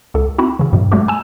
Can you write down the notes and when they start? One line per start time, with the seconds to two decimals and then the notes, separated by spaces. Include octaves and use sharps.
0.14 C#2 A4
0.38 C4 D#4 E4 F#4
0.59 C#3 E3
0.73 G2 B2 F#3
0.92 F#3 G#3 A3 F#4 G4
1.08 G#5 A5 E6 E7